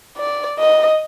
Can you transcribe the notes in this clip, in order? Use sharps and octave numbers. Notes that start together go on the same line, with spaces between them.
D5
D#5